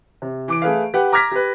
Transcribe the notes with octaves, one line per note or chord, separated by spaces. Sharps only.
C3
E3 D6 D7
A3 G#4 B4 F5
G4 B4 F#5 G5
A#5 D6 F6 G#6 A#6 B6
G4 B4